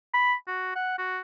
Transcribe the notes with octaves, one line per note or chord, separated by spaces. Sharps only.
B5
F#4
F#5
F#4